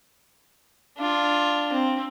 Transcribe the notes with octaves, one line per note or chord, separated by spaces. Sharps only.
D4 F4
C4